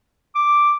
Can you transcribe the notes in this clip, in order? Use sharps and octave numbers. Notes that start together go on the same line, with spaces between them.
D6